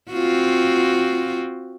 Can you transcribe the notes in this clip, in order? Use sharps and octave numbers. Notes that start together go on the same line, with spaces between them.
C4 F4 F#4